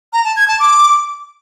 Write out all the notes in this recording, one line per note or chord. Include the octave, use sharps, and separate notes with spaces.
A#5
A5
G#6
A5
D6